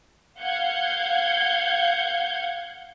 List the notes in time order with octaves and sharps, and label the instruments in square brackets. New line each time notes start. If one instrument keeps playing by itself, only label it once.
[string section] F5 F#5 G6 G#6